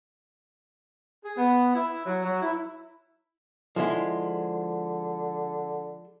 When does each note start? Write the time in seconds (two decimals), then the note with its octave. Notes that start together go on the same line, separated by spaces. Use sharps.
1.23 G#4
1.36 B3
1.74 E4
2.05 F#3
2.24 F#3
2.41 E4
3.76 D3 F3 G#3 E4